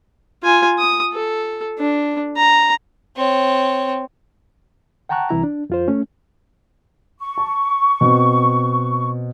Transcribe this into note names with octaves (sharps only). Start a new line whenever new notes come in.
F4 G#5
D#6
A4
D4
A#5
C4 C#5
F#5 G5 A5 A#5 C#6 F#6
C2 E3 E4 A#5
D4
F2 F4 C5
A3 C#4
C#6
A5
B2 C4